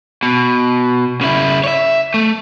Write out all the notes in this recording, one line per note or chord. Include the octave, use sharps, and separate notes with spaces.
B2
C#3 E4
C#5 E5
A3